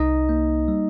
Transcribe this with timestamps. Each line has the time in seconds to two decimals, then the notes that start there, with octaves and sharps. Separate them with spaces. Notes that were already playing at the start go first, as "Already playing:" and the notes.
Already playing: C2 D#4 D#5
0.29 A#3
0.68 G3